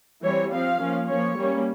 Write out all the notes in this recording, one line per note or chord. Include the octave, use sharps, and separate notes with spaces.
E3 G3 C4 C#5
F3 C4 F5
F3 A#3 C#4
F3 A#3 C#4 C#5
G3 A#3 C#4